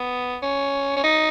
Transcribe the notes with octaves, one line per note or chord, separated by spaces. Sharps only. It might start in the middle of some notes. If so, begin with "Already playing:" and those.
Already playing: B3
C#4
C#4
D#4